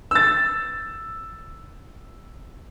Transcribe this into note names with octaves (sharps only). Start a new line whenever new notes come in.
E6 A6